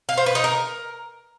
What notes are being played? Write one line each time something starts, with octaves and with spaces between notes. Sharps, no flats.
F5
C5
B4
D#4
A#4